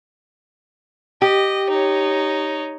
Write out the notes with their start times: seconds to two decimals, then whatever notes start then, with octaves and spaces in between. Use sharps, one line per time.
1.22 G4 D#5
1.70 D#4 C#5